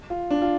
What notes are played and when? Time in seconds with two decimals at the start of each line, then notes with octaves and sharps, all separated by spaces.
0.10 F4
0.30 D4
0.42 F4